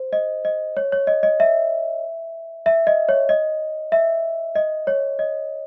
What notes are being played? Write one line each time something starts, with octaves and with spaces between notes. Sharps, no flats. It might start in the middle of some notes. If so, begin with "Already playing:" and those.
Already playing: C5
D#5
D#5
C#5
C#5
D#5
D#5
E5
E5
D#5
C#5
D#5
E5
D#5
C#5
D#5